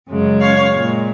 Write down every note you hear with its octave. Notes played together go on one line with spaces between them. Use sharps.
F#2 C#3 G#3
C#5 F5
A#2 G#3